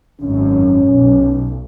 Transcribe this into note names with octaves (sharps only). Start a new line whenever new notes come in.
G#1 F#2 C#4
B1